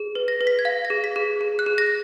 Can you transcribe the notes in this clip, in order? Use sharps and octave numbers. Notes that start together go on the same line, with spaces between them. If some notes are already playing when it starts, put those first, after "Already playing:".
Already playing: G#4
B4
A#6
B4
B6
G#6
F5 A#6
A#6
G#4
B6
G#4
G#4
F#6
G#4
A#6